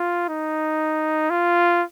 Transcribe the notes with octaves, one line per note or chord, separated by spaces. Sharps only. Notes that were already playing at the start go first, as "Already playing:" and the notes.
Already playing: F4
D#4
F4